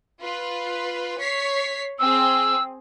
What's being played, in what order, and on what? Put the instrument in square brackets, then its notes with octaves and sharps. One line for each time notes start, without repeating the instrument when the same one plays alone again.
[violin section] F4 B4
C#5 B6 C7
[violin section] C4 G#4 [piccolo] E6